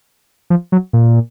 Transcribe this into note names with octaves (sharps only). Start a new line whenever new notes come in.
F3
F#3
A#2